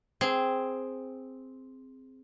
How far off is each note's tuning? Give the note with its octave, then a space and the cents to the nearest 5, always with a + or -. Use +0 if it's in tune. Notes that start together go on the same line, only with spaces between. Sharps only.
C4 +0 G#4 +0